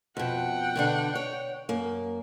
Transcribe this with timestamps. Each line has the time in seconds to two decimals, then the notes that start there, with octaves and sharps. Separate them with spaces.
0.17 F2 B2 F#5 G5
0.76 B2 D3 D4
1.15 C#5
1.69 F#2 A#3